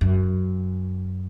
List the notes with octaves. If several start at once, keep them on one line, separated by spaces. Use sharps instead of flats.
F#2